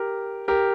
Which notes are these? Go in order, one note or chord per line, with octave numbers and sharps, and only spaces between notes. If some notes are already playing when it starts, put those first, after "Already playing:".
Already playing: G4 A#4
G4 A#4